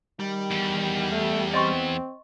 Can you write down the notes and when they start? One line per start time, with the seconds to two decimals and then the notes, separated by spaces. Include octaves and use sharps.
0.20 D#3 G3
0.51 E2
1.12 A3
1.54 C4 D#5 C6 C#6